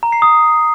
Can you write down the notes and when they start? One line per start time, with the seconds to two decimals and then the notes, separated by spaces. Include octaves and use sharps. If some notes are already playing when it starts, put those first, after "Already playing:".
0.03 A#5
0.12 C7
0.22 D#6